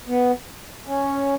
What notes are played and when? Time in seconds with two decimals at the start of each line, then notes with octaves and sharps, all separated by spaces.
0.08 B3
0.87 C#4